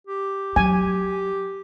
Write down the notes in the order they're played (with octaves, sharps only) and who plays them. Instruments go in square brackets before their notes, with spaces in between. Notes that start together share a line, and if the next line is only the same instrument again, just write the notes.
[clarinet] G4
[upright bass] F#3 [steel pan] G#5